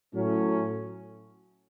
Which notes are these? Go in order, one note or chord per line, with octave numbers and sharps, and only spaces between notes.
A2 F#3 A3 C#4